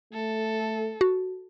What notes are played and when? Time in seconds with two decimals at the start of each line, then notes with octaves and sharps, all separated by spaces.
0.13 A3 A4
1.01 F#4